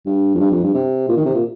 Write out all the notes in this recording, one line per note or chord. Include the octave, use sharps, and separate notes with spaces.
G2
F2
G2
F2
G2
C3
A#2
D#3
C3
A#2